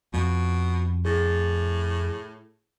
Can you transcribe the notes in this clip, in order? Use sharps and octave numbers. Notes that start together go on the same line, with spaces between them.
F2 B2
A2 G#4 A6